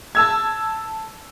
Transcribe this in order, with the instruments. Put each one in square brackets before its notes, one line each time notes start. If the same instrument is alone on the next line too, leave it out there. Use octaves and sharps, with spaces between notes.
[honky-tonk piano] A5 E6 G#6